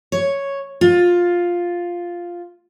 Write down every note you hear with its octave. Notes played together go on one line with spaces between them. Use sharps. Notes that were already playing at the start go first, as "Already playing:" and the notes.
C#5
F4